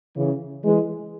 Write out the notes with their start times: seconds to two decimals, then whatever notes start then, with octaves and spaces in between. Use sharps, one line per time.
0.16 C#3 E3
0.64 E3 G#3